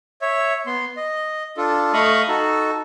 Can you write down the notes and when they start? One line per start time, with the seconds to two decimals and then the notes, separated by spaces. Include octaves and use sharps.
0.22 C#5 E5
0.67 B3 C6
0.97 D#5
1.57 D4 F4 A4
1.93 A3 D#5 F5 B5 C#6 D#6
2.28 D#4 F#4 A4